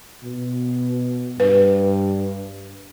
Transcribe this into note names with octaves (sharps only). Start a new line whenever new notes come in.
B2
G2 B4